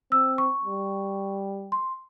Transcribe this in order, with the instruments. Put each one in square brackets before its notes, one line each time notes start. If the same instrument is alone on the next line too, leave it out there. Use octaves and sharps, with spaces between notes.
[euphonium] C4 [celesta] E6
[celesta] C#6
[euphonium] G3
[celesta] C6